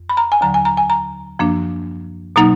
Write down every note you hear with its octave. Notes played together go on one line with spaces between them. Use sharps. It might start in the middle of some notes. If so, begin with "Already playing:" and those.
Already playing: F2
B5
A#5
G#5
D#2 D3 F#3 A#5
G#5
A#5
G#5
A#5
F#2 F3 A#3 D4
B2 F#3 A#3 D#4 A#5